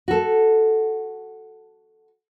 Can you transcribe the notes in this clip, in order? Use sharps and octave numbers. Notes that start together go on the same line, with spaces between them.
F#4 A4